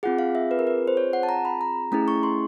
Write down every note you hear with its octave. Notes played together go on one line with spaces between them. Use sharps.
C4 F4 G#4 F#5
F5
E5
B4
A#4
B4
C5
C#5
F#5
A5
A#5
B5
A#5
A3 C#4 E4 G#4 A#5
C#6
C6